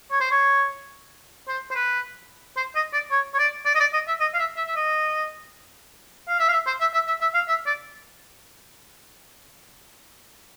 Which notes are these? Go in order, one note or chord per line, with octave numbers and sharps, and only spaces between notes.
C#5
C5
C#5
C5
C5
B4
C5
D#5
D5
C#5
C#5
D5
D5
D#5
D5
D#5
E5
D#5
F5
E5
E5
E5
D#5
F5
E5
F5
E5
C5
E5
E5
E5
E5
F5
E5
D5